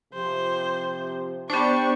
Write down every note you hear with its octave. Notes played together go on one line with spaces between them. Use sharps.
C3 F3 C5
B3 D4 G4 C5 C#6